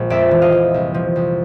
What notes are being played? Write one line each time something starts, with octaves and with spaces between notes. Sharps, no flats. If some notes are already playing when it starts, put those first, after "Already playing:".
Already playing: A#1 G#3
F2 D5 E5
E3
D#5 F5
F2
C2
F3
C2